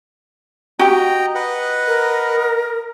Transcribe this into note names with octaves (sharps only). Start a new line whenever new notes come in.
F#4 G4 D#5 G5 A#5
B4 D#5 F#5
A#4